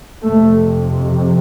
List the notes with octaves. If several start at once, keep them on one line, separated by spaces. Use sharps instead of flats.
F2 C3 A3